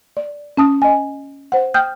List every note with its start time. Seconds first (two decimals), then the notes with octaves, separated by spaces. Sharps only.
0.17 D5
0.57 C#4 A5 D#6
0.82 D#5 G#5
1.52 C5 F#5
1.74 G5 D#6 F6 G6